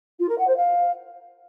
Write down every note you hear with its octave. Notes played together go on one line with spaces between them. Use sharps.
F4
A#4
F#5
C5
F5